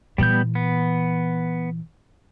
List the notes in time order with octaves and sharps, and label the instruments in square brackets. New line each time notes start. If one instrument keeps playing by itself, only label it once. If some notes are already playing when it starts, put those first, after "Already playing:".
[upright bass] A#2 E3 [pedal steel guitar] G3 B3 G6
[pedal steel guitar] B3